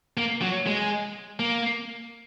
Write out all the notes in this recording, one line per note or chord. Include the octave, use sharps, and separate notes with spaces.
A#3
F#3
G#3
A#3